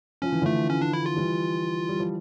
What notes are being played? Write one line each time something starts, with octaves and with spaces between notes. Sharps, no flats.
F3 C#4
E3
D3 F3 A3
C#4
D4
E4
F4
E3 G3
G3
F3